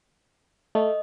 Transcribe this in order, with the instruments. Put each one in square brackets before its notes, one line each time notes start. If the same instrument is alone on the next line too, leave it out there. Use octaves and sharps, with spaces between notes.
[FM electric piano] A3 [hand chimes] D#5